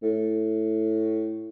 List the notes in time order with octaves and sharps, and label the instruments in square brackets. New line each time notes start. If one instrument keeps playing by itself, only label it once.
[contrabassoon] A2